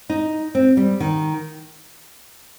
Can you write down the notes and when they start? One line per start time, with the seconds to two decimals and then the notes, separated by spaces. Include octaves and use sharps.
0.10 D#4
0.55 C4
0.77 G3
1.00 D#3